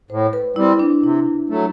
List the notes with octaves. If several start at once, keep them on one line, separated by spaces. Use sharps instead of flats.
A2 C5
B4
G3 C4 E4
D4
C3 E4
F#3 A3